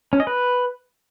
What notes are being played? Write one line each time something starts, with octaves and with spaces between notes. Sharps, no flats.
C#4
D#5
B4